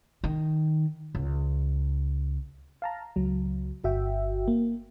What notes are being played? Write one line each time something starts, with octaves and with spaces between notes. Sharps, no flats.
D#3
C#2
F5 A5 A#5
C#2 F#3
G1 F#4 E5 G5
A#3